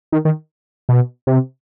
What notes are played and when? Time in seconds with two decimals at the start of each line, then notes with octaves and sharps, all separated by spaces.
0.12 D#3
0.25 D#3
0.89 B2
1.27 C3